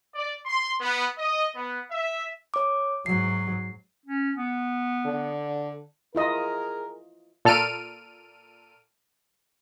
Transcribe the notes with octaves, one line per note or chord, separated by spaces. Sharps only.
D5
C6
B3
D#5
B3
E5
C#5 D6
G#2 F#3 C7
C#4
B3
D3
E4 F4 G#4 A#4 D#5
A#2 A4 F6 D7 D#7